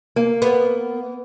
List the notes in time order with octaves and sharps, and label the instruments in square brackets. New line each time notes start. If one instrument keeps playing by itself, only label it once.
[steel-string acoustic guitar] A#3
[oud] B3